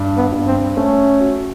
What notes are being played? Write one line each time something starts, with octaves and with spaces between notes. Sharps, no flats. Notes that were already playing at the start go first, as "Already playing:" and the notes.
Already playing: G2
B3
G2
C4
A3 C#4
F#4